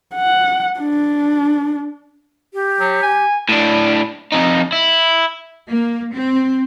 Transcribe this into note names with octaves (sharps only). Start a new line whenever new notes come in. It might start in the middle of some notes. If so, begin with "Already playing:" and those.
F#5
D4
G4
F#3
G#5
A2 D4
F2 D#4
E4
A#3
C4